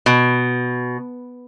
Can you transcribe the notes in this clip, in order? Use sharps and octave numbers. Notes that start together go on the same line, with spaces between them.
B2